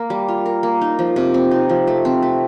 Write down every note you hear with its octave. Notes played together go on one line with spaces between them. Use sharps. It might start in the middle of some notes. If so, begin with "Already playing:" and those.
Already playing: A#3 A#4
G3
F4
A#4
A#3
D#4
F3
C3
C4
D#4
F3
A3
C4
A3